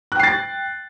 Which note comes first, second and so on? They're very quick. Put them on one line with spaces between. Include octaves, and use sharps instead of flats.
F#6 G5 C7 A6